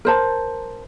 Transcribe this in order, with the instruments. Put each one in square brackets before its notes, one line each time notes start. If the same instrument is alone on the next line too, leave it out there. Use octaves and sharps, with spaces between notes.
[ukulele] A#4 C5 A5